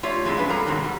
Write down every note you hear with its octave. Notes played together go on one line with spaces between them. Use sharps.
A3 F4 G4 C#5 D5
F2 C3 G#3 D4 E4
F3 F#3 C#4 D4 B4
G3 C4 A4 A#4 A#5
G#2 B2 D#3 F#3 G#3
G3